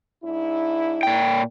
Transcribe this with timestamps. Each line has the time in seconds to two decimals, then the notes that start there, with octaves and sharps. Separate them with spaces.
0.24 G#2 D4 E4
1.03 A#2 G5